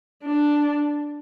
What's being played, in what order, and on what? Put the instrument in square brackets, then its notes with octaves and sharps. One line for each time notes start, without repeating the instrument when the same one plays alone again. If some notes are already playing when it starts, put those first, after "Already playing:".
[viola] D4